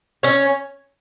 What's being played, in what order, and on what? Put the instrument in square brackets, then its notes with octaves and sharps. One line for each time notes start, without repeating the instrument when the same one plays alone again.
[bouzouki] C#4 C#5